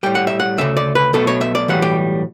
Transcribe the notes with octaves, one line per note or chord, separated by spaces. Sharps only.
A2 G3 G5
F#5
E5
F#5
D2 C#3 A3 E5
D5
B4
B1 B2 A3 A4
C#5
E5
D5
B1 A2 E3 G3 F#5
G4